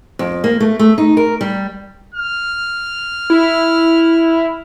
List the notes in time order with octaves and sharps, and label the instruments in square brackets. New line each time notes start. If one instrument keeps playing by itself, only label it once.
[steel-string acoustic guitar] F2
A#3
A3
A3
D#4
A#4
G3
[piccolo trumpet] F6
[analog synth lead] E4